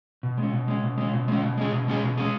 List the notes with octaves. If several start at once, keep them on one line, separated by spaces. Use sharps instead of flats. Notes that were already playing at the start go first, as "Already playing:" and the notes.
B2
G#3 C#4
B2
G#3 C#4
B2
G#3 C#4
B2
G#3 C#4
B2
G#3 C#4 G#4
B2
G#3 C#4 G#4
B2
G#3 C#4 G#4